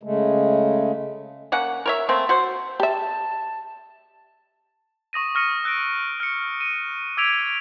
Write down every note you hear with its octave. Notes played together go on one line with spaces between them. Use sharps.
C#3 G#3 A3
A#3 C#4 F#5
A#4 C#5 E5
A3 A#3 C4
F#4 C5
G4 E5 A5
C#6 D#6 A#6 D#7
C#6 D#6 F6 A#6 C#7 D#7
E6 F#6 A#6 D7
F6 C#7
D#7
D6 E6 G#6 B6 D7 F7